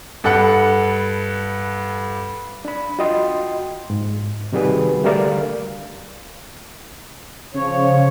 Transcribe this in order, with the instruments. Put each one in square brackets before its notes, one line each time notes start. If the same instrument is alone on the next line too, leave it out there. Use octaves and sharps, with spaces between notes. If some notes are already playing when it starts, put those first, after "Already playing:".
[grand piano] G2 A4 F#5 B5
[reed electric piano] D4 B5
F4 F#4 D#5 G5 C6
G#2
C3 D#3 G3 F#4 G#4 B4
D3 G3 A3 A#4 D5 F5
[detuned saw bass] C#3 [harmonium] F3 C#5